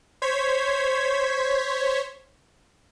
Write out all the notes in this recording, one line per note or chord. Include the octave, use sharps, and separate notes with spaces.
C5 C#5 G#6 B6